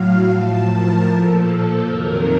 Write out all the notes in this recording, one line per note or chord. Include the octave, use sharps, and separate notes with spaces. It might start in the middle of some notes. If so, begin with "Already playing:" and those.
Already playing: A2 F#3 F5
A2 F3 A5
A#4
A#2 F3 A4
F2 C3 D#3 F#3 A#4